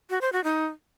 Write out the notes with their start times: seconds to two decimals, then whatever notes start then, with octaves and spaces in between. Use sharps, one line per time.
0.10 F#4
0.21 C5
0.33 F#4
0.44 D#4